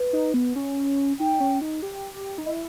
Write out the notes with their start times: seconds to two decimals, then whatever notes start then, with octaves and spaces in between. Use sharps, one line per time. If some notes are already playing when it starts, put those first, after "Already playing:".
Already playing: B4
0.13 D#4
0.34 B3
0.56 C#4
1.20 D#4 G5
1.40 C#4
1.61 D#4
1.82 G4
2.38 D#4
2.46 E4 D#5